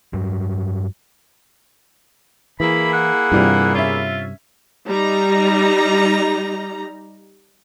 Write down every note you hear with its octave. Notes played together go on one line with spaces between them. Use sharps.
G2 F#3
E3 A#3 E4 G#4 B5
F#5
G2 C3 E3 G3 F4
C#4 F4 E5
G3 D#4 A#5